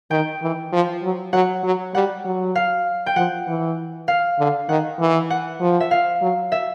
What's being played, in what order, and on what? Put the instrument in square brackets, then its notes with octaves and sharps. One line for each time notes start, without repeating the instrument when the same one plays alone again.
[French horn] D#3 [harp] G5
[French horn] E3
F3
F#3
[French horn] F#3 [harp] F#5
[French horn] F#3
[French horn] G3 [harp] F#5
[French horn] F#3
[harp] F5
G5
[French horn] F3 [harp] F#5
[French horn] E3
[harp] F5
[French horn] D3
[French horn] D#3 [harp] F#5
[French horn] E3
[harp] F#5
[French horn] F3
[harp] E5
F5
[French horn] F#3
[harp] E5